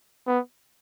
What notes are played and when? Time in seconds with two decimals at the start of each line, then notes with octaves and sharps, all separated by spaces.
0.28 B3